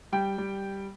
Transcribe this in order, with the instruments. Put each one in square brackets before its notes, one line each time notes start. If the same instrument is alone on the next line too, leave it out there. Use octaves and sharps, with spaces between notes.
[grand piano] G3 G5
G3